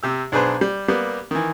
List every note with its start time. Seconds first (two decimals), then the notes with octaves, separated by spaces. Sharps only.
0.03 C3 G4 E6
0.32 B1 D4 G#4 B4 C5
0.61 G3
0.88 G3 A#3 B3
1.31 D#3 E3